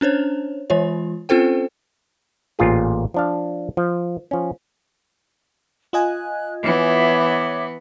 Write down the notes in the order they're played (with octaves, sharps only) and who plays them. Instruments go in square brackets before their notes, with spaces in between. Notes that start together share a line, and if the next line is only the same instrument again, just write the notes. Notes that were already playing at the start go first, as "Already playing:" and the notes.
[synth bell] C#4 D4 C5 C#5
E3 G#3 F4 C#5
C4 C#4 F4 A4 C5 G5
[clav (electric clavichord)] A1 A#2 F4 G#4
F3 D4 F5
F3
F3 C#4
[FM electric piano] F4 D#5 G#5 [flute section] F#6
[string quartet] E3 B3 [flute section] C#5 E5 D6